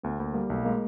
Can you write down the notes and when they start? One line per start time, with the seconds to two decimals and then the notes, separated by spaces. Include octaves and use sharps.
0.03 D2 B3
0.20 D2 A#3
0.34 G3 A#3
0.50 B1 A3
0.65 G#3 A#3